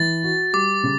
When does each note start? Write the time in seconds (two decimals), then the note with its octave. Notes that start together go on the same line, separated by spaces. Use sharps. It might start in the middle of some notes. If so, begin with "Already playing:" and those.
Already playing: E3 A6
0.24 F#4
0.53 G3 D6
0.83 C#3